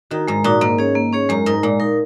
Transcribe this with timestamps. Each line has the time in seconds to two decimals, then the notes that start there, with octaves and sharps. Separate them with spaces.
0.11 D#3 D#4 F#4
0.28 G#2 G#3
0.44 A#2 D#4 F#4
0.61 G#2 A#3
0.78 C#4 G#4 C#5
0.95 A#3
1.13 C#4 G#4 C#5
1.29 F#2 G#3
1.46 G#2 D#4 A#4
1.63 A#2 G#3
1.80 D#4 A#4